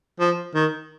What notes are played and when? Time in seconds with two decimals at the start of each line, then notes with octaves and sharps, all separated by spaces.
0.20 F3
0.55 D#3